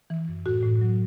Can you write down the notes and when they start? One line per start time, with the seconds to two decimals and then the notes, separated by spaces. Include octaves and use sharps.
0.10 E3
0.28 F#2
0.45 A2 F#4
0.63 A2
0.81 F#3